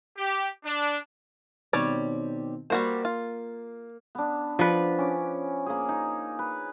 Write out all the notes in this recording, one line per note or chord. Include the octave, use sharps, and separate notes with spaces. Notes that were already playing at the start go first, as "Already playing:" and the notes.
G4
D4
B2 D#3 G3 C4 C#5 D5
G3 A#3 F#4 C5
F4
B3 D4
F3 D4 B4
C#4 D6
A#3 G#4
D#4
B4